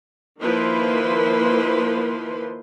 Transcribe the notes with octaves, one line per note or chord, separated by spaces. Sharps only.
D#3 F3 A#3 E4 B4 C6